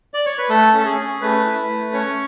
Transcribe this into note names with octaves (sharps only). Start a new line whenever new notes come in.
D5
C#5
B4
A3 A4
C#4
A4
G#4
C#4
A3 B4
E4
A3
C#4 C#5